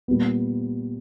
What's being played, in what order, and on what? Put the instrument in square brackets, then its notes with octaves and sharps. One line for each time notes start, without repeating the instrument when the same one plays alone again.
[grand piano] A#2 G3 B3